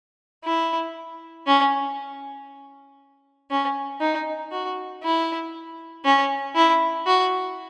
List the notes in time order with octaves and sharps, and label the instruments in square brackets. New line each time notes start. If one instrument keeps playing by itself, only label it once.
[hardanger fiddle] E4
C#4
C#4
D#4
F#4
E4
C#4
E4
F#4